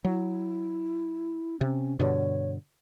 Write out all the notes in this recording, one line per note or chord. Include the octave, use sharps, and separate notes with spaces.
F#3 E4
C3 C#4
G2 B2 D3 C#5